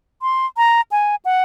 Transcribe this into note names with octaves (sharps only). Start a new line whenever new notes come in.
C6
A#5
G#5
F#5